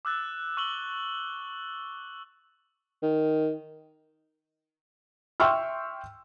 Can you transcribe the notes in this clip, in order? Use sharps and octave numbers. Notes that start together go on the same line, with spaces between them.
D6 E6 F#6 A6
C#6 E6 F#7 G7
D#3
E5 G5 C6 C#6 E6 F6